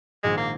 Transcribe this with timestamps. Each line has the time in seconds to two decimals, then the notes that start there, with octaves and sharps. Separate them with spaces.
0.23 A#1 G#2 D#3 G#3
0.37 A#3